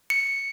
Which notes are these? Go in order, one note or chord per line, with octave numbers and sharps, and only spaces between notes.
C#7